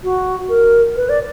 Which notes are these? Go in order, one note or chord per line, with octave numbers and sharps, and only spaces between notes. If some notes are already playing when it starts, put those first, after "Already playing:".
F#4
A#4
B4
D5